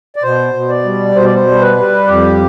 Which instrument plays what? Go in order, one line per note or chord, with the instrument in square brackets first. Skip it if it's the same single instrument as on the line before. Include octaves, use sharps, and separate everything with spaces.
[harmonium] D5
B2 C5
B2
D5
G3
B2 C5
D5
C5
G3
B4
G3
F2 G4